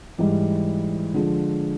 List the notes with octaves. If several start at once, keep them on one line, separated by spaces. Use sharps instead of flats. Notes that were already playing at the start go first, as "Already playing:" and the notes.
G#2 E3 G3
D3 F3 G#3